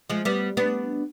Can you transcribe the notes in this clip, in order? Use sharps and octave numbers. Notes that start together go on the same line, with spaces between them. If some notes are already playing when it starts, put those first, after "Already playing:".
F3 G#3
G3 B3
B3 D4